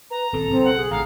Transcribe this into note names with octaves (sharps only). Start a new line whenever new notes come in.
B4 A#5
D#1 C4 A4
B1 C#3 C4
F#5
G#4
A1 F5 A#5